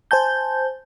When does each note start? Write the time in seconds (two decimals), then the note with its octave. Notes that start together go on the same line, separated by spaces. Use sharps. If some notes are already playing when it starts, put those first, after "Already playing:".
0.11 C5 G#5 A5 G6